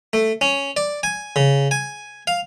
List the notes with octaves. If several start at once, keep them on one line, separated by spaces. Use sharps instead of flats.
A3
C#4
D5
G#5
C#3
G#5
F5